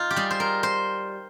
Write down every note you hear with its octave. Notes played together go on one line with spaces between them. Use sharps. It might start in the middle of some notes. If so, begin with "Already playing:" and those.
Already playing: D#4 F4
G4
G3 G#4
C5
A#4
C5